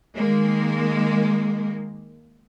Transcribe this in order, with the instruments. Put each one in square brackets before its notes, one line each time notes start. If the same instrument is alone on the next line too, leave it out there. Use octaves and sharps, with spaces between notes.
[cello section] D#3 G#3 A#3